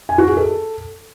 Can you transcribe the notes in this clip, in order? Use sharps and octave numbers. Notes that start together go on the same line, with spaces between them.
G#5
F#4
G#4
A4